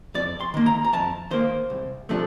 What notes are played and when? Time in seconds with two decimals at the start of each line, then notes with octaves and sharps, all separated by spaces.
0.14 F2 D5
0.41 C6
0.54 D#3 A#3
0.66 A#5
0.85 A#5
0.93 F2 A5
1.31 D#3 A#3 C5
1.70 C2
2.09 C3 F3 A3 D4